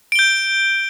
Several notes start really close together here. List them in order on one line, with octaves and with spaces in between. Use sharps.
D7 G7 G6